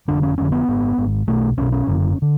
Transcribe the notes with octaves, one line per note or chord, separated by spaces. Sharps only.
F1 F2 D3 D4
C#4
F1 F2 D3 C#4
B3
G#1 G#2
G#1 G#2
B1 B2 A3
B1 B2 C#4
C#4
F#1 F#2 D3
D3